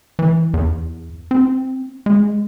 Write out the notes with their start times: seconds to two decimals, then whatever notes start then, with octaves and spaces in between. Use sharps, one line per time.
0.19 E3
0.54 E2
1.31 C4
2.06 G#3